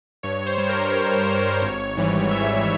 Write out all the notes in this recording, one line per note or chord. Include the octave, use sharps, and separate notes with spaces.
G2 C#5
C5
G3
C5
A#4
G2 C#5
G3
G#1
G#2 E3 G3
G#1 E5